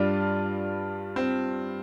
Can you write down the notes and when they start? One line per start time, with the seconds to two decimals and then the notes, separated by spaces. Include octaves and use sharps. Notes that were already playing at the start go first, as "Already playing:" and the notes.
Already playing: G2 G3 D4 F4
1.16 C4